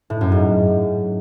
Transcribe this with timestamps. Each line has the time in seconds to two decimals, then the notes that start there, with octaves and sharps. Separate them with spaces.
0.10 A2
0.21 F#2
0.32 G#2